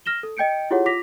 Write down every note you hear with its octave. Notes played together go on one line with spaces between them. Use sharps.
F6 A#6 E7 G7
A4
D#5 G5 G6 C#7 D7
E4 F4 G4 G#4 C#5 F#5
F4 D6 A#6 B6 F7